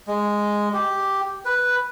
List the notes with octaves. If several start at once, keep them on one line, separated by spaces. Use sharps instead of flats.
G#3
G4
B4